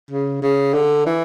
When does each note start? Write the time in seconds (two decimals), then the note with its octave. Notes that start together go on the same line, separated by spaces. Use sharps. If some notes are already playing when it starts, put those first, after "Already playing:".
0.10 C#3
0.42 C#3
0.74 D3
1.06 E3